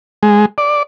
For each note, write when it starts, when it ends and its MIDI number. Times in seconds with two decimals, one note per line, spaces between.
0.23 0.46 56
0.58 0.83 74